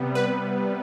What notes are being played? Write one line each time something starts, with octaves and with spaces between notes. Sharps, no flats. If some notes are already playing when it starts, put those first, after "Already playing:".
Already playing: C3 G3 B3
B4